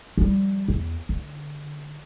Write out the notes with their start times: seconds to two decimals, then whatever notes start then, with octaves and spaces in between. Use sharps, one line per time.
0.18 F3 G3
0.68 E2
1.09 D3